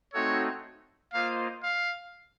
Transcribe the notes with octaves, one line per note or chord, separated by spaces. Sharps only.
A3 C4 D#4 F#4 A4 C#5
A#3 F4 C5 D#5 F5
F5